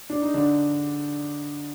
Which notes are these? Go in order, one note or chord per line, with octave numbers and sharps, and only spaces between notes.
D4
D#4
D3 D4